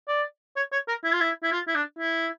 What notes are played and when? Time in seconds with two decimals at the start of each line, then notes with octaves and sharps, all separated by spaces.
0.08 D5
0.56 C#5
0.72 C#5
0.88 A#4
1.04 E4
1.12 F4
1.20 E4
1.43 E4
1.52 F4
1.68 E4
1.75 D4
1.99 E4